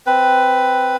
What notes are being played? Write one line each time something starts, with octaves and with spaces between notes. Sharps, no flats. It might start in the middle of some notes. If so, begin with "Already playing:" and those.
C4 B4